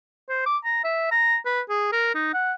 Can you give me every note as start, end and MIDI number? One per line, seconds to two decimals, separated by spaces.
0.29 0.45 72
0.46 0.58 86
0.65 0.81 82
0.84 1.10 76
1.12 1.37 82
1.46 1.61 71
1.69 1.92 68
1.92 2.14 70
2.15 2.33 63
2.34 2.53 78